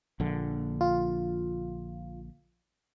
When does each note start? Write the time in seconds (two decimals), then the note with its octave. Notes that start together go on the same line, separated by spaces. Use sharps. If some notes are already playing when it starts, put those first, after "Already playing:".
0.20 A#1 D3
0.81 F4